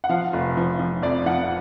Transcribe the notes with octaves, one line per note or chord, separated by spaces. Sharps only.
F#5
F3 F5
F1
F3
F3
F2 D5
F3 F#5